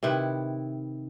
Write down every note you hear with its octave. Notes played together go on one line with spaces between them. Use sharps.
C3 D#3 E4 B4